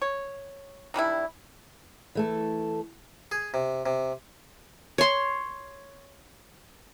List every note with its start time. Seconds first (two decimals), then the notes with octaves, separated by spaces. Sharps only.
0.02 C#5
0.94 D#3 G3 D4 E4
2.15 E3 A3 A4
3.32 G#4
3.54 C3
3.86 C3
4.98 C#5 C6